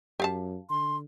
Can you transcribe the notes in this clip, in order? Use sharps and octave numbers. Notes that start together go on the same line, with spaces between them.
F#2 G4 F5 A5
D3 C6